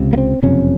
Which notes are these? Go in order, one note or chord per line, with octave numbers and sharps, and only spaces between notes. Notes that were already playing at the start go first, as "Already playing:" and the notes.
Already playing: C#2 C3
A#3
C4
F#1 F2 C3 C#4